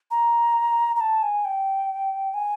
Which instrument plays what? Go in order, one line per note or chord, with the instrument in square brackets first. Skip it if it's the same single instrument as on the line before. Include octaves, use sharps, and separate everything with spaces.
[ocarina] A#5
A#5
A5
G#5
G5
G#5